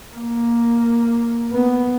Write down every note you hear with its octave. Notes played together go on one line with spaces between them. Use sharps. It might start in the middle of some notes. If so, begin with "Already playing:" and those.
A#3
B3